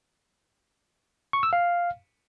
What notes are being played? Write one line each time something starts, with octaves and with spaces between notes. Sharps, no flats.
C#6
E6
F5